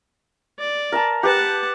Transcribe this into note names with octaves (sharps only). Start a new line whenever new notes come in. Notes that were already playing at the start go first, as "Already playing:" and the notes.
D5
A#4 G#5 A5
G4 B4 F#5 A5